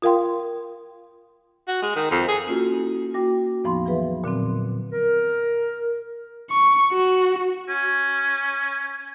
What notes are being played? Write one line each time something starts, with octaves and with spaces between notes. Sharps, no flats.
F4 A#4 F5 G5 C6
F#4
G#3
D#3
F2
G#4
A#3 C#4 F4 F#4 A4
E4
A#3 F#4 G5 D6 A#6
E2 A2 F3 B3 D#4 C6
E3 F#3 G#4 B4 E5
A#2 D3 F#3 C4
A#4
C#6
F#4
C#4